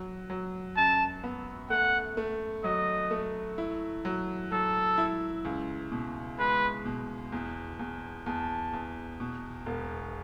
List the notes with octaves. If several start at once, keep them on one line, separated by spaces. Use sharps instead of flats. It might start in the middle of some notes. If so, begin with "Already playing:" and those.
Already playing: F#3
F#3
F#2 A5
B3
A3 F#5
A3
F#3 D#5
A3
E4
F#3
F#3 A4
E4
C#2
B2
G#3 B4
B2
E2
E2
E2 A5
E2
B2
E1